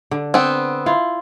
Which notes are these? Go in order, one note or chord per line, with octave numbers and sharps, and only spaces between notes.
D3
B3 C4
E4 F4